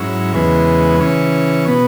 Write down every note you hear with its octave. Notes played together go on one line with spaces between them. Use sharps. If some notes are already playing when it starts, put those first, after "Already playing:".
Already playing: G#2 F#3 C#4 E4
E2 C#3 E3 G#3 B3
C#3 E3 C#4
B2 B3